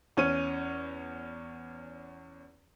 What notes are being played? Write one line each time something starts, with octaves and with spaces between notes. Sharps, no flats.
E2 C#4 C#5 D#7